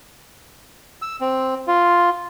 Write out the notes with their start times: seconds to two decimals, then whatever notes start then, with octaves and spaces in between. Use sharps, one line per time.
1.02 E6
1.21 C4
1.67 F4